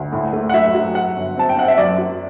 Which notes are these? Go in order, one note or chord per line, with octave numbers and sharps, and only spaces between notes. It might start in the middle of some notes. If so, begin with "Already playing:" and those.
Already playing: D2
A2
A3
F#5
F#3 E5
F#3
F#3 F#5
G1
C4 A5
G5
C4 F#5
E5
F#2 D5
F#3